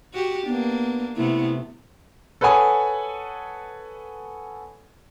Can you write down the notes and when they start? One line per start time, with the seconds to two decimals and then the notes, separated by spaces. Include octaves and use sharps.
0.13 F#4 G4
0.47 A#3 B3 D4
1.17 C3 A3 B3 E4
2.41 A4 B4 C#5 F#5 G#5 D#6